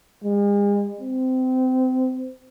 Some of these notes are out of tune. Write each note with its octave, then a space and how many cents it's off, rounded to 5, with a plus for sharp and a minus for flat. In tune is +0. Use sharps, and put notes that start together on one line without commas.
G#3 -40
C4 -25